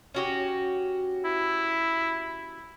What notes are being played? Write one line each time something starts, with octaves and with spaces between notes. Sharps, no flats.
C#4 F#4 G4
E4